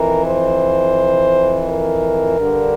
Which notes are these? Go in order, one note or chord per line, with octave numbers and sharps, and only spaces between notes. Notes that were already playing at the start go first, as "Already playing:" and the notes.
Already playing: F2 E3 A#4
C5
A#4
G2 D3